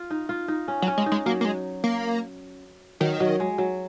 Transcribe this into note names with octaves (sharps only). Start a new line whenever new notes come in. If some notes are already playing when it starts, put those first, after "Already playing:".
Already playing: F4
D#4
F4
D#4
C#4
F#3
C#4
G#3
D#4
G#3
F#3 A#3
A#3
G#3
A#3
D#3 F#3
F#3
G#3
F#3